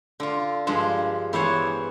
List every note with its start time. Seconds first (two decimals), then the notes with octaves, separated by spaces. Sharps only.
0.20 D3 F4
0.67 G2 F3 G#3
1.33 E3 B3 C5 C#5